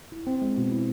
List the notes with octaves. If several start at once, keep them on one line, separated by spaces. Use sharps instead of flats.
E4
C4
G#3
B2
E4